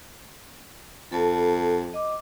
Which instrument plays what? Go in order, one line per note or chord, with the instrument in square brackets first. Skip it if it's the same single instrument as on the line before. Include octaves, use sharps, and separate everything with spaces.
[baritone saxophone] F2 [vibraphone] A4 A5
[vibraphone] D#5 D6